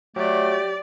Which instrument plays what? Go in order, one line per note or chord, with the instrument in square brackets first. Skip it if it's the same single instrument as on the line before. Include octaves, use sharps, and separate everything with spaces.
[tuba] F#3 [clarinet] A3 [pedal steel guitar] G4 [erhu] D5